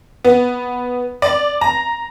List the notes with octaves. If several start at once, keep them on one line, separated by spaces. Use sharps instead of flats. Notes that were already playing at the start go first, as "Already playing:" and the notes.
B3
D5
A#5